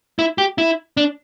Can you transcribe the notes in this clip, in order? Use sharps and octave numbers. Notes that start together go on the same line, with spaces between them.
E4
G4
E4
D4